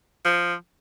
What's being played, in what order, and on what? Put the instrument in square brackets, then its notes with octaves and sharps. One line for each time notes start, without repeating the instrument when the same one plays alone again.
[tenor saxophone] F3